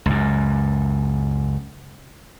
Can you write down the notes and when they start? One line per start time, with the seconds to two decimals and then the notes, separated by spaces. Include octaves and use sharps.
0.06 C#2 F#2